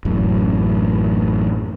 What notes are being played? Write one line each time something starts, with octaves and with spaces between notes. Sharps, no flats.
A1 F#2 A2